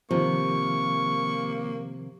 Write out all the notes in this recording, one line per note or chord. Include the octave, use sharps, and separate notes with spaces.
C3 D#3 F3 A#3 C#6